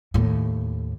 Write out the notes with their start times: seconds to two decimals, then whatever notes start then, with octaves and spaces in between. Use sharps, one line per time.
0.14 D#2 A2